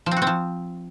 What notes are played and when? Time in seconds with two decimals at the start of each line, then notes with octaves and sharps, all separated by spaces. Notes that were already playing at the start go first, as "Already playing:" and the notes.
0.06 F3
0.11 C4
0.17 F#4
0.22 C4
0.27 F3